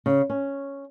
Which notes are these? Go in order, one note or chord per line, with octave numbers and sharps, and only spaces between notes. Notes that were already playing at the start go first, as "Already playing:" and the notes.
C#3
C#4